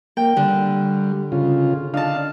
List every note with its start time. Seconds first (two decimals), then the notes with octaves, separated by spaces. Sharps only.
0.17 A#3 G5
0.37 D3 G3
1.32 C#3 F4
1.94 D4 D#4 F5 A5